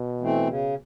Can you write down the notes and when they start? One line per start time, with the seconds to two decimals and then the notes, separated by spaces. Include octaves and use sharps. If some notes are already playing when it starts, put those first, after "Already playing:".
Already playing: B2
0.21 E3 A3 C4
0.48 C#3